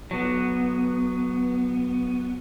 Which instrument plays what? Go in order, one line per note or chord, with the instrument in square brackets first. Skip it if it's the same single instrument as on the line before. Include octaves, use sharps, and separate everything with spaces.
[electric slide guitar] F#3 B3